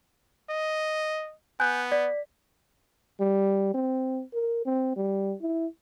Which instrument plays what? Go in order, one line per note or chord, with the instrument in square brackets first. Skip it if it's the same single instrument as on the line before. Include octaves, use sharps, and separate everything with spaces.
[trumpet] D#5
[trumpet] B3 [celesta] G#5 F#6 G6
[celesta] D5 B6
[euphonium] G3
C4
A#4
C4
G3
E4